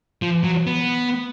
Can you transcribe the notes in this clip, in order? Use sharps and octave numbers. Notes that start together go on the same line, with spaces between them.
F3
F#3
B3